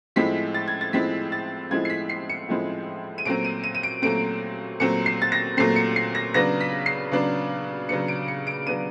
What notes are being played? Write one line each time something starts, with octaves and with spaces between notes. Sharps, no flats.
A2 F3 G#3 C4 E4 B6
A6
G#6
A6
A2 F3 G#3 C4 E4 B6
A6
A2 F3 G#3 C4 E4 G#6
C7
B6
C7
C#7
A2 F3 G#3 C4 E4
D#7
A#2 F#3 A3 C4 D7
D#7
D#7
D#7
D7
A#2 F#3 A3 C4 D7
A#2 F#3 A3 C4 C#7
C7
A6
A#6
A#2 F#3 A3 C4 C7
C#7
C7
A#6
C#3 F#3 B3 D4 A#6
B6
C7
C#3 F#3 B3 D4
C#3 F#3 B3 D4 C#7
D7
C#7
D7
C#3 F#3 B3 D4 D#7